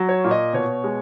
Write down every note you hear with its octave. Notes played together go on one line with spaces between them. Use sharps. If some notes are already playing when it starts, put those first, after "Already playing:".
Already playing: F#3
C#5
A#2
D#5
B2 C#5
G#3